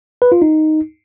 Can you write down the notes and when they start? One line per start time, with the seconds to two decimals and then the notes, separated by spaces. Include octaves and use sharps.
0.22 B4
0.32 F4
0.42 D#4